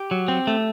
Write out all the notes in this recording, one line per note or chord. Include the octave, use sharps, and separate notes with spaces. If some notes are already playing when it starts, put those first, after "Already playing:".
Already playing: G4
F#3
C4
A3